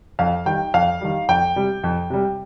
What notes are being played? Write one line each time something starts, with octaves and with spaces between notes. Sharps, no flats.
F2 F5
D#3 G3 G5
F2 F5
D#3 G3
F2 G5
C3 G3
F2
C3 G3